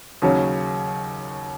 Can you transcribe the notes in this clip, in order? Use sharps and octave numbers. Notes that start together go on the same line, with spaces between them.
D#2 C#3 F#3 C#4